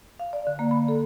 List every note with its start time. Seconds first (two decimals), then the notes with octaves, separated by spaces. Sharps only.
0.20 F5
0.33 D5
0.47 D3
0.59 A#3
0.71 B5
0.88 A4